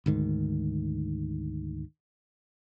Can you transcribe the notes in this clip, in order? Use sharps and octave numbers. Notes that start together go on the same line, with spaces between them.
D2 G#2 D#3